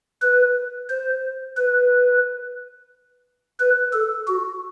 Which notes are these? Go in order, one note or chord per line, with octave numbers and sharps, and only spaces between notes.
B4
C5
B4
B4
A4
F#4